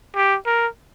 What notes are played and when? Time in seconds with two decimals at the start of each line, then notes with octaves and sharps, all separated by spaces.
0.16 G4
0.46 A#4